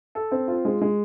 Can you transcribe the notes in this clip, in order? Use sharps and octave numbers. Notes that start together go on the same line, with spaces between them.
A4
C4
F4
G#3
G#3